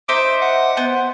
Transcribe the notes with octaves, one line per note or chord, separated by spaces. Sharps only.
D#4 C5 E5 D6
F#5
B3 C5